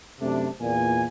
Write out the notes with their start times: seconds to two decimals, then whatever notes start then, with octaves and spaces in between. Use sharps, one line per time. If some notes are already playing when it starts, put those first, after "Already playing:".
0.21 F#2 C3 A3 D4
0.61 E2 A#2 G#5